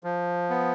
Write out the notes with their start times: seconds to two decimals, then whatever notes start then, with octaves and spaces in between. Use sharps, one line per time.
0.04 F3
0.50 B3